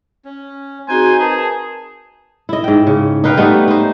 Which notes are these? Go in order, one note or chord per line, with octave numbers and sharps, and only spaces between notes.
C#4
C4 D#4 F#4 G#4 C5 G#5 C6
G#4 A#4 B4 A5
E4 D#5
G#2 G5
C#3
D#4 B4 F5 G5
G3 A3 B3 D#4
D#4 C5